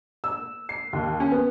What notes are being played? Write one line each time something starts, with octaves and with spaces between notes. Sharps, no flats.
E6
C7
D#2
C#4
B3